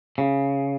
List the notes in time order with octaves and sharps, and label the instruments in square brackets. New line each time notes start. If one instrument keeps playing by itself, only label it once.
[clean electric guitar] C#3